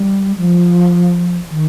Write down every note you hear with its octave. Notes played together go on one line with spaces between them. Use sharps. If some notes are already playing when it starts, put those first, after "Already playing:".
Already playing: G3
F3
D#3